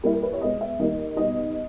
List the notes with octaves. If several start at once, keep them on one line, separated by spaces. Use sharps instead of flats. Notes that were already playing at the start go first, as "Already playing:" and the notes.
G3 A#3 E4 A#4
A#4
B4
C#5
B2 G#3 B3 D#5
E5
D#3 G3 A#3 D#4 D#5
B2 G3 B3 D#4 D#5